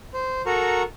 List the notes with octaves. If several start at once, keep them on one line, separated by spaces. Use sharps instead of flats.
C5
F#4 A4 A#4 A#5 C#6